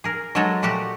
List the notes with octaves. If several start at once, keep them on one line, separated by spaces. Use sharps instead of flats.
G#4 A#4
F#3 G#3 F#4 A4 C#5 D#5
A#2 A3 F#4 G4 F#5